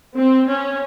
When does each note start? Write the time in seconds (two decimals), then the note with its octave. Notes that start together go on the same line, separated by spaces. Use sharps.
0.16 C4
0.48 C#4